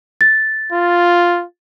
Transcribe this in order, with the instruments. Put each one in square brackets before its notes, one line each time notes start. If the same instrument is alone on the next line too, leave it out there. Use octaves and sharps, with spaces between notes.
[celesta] A6
[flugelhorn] F4